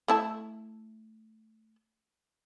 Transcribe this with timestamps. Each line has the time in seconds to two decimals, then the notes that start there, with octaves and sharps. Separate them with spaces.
0.08 A3 E4 A5